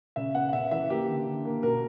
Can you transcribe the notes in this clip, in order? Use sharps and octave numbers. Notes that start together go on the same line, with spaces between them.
C#3 E5
B3 F#5
F#5
C#3 E5
E3 E5
A#3 G4
D3
D3
A#3
B2 A#4